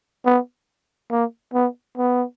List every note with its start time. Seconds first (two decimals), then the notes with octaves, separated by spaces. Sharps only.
0.26 B3
1.11 A#3
1.54 B3
1.98 B3